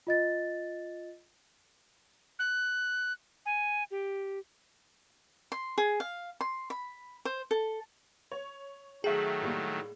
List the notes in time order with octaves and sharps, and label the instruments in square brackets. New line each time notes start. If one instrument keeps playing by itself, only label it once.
[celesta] F4 D#5 A6
[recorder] F#6
G#5
G4
[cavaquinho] C6
G#4
F5
C6
B5
C5
A4
[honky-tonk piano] C#5
[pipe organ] D#3 F#3 A3 [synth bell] G#4 [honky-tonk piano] E5 G5
[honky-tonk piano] A2 G3 A#3